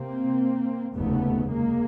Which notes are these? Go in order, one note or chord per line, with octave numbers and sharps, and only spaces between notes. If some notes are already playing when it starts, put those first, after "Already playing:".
Already playing: C3 A#3 C4
F1 D#2 C#3 A3 B3
G#3 A#3